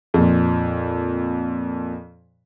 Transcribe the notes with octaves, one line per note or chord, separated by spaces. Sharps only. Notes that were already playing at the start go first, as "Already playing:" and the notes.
F2 A#2